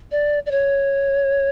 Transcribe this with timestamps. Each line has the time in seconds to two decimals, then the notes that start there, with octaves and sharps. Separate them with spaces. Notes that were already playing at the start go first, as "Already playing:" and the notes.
0.12 D5
0.46 D5
0.51 C#5